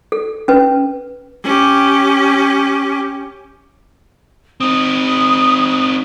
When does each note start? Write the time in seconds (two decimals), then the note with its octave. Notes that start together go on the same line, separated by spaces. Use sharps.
0.12 A4
0.48 C#4 B4
1.44 C#4 G4
4.60 C4 D#4 D#6